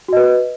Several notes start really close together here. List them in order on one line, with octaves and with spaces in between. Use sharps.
F#4 D#5 B4